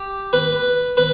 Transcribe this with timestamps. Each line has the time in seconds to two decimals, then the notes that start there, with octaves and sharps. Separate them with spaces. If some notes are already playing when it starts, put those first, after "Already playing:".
Already playing: G4
0.33 B4
0.97 B4